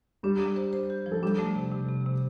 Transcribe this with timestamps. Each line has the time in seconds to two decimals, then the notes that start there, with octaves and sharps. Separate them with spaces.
0.23 G3 D4 G4
0.40 D4
0.56 C5
0.73 C5
0.90 G4
1.06 F3
1.12 A4
1.23 G3 D4 G4
1.39 A3
1.56 C3
1.72 C3
1.89 C3
2.06 C3